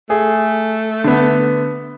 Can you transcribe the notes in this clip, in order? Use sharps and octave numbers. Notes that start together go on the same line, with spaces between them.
A3 G#4
D3 B3